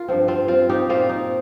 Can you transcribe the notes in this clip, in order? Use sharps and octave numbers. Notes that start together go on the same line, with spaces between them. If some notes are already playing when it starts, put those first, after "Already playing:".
Already playing: F4 A#4
G2 F3 C4
C4 F4
C4 F4
D#4 G4
A#2 A#3 C4 F4
D#4